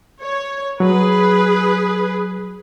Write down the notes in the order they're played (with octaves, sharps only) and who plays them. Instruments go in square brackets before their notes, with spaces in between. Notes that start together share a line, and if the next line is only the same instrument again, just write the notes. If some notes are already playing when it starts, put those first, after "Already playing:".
[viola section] C#5
[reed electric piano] F#3 [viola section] G#4 B4